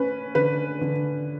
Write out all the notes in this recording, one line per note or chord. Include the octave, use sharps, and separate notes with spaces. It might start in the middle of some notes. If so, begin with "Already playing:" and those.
Already playing: C#4 B4
D3 B4
D3